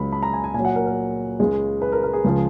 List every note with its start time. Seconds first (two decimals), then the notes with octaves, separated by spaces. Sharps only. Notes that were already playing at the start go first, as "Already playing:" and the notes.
Already playing: C#2 C#3 F#3 B5
0.12 B5
0.23 A#5
0.33 G#5
0.44 G#5
0.54 A#2 G#5
0.59 F#3
0.65 F#5
0.76 A#4
0.87 A#4
1.40 C#2 C#3 G#3
1.82 B4
1.92 A#4
2.03 A#4
2.13 G#4
2.24 C#2 C#3 F3